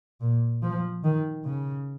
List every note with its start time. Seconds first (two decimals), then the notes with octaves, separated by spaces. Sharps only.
0.21 A#2
0.63 F3
1.04 D#3
1.45 C#3